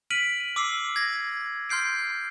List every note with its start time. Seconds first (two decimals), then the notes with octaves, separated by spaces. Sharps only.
0.10 F6 B6 D7 D#7 F#7
0.56 D6 E6 C7
0.96 G#6 A#6
1.70 C6 F6 G6 C7 D7